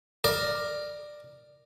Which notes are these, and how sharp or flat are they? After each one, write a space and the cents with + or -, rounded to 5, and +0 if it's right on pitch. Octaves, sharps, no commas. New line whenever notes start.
A#4 +0 D5 +15